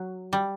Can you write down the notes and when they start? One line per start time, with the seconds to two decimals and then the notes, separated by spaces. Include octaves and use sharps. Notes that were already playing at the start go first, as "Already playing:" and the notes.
Already playing: F#3
0.33 G3